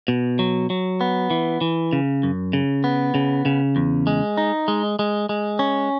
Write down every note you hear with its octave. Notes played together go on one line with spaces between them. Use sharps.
B2
F#3
F#3
B3
E3
E3
C#3
F#2
C#3
B3
C#3
C#3
E2
G#3
D#4
G#3
G#3
G#3
C#4